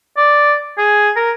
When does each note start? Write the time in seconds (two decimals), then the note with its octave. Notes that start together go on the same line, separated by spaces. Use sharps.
0.17 D5
0.78 G#4
1.16 A#4